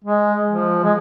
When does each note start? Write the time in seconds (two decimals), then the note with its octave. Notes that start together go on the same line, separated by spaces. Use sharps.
0.04 G#3
0.49 F3
0.84 G#3